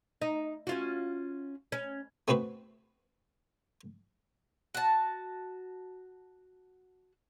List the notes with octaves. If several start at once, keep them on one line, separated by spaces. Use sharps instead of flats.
D#4
C#4 F4 F#4
C#4
A3 B3 C4 F#4 B4
F#4 A5